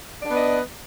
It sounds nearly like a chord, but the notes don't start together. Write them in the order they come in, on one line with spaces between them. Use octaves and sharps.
D5 D4 B3 B4 D#5